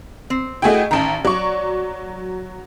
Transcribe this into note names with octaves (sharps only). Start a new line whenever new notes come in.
C4
A3 E4 F#4 G#4 D#5 G5
A1 D#3 A5 A#5
F#3 D5 C#6